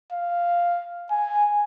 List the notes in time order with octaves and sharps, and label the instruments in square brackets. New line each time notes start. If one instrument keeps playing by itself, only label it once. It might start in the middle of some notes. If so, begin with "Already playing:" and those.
[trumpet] F5
G#5